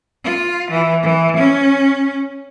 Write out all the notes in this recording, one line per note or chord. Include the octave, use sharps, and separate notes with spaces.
F4
E3
E3
C#4